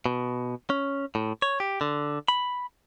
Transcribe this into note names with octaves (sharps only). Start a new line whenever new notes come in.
B2
C#4
A2
C#5
G4
D3
B5